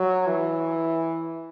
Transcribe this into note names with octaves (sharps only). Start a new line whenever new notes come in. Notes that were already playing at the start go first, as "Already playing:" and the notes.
Already playing: F#3
E3